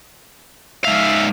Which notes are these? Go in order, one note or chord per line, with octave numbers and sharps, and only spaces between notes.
G#2 E5 F5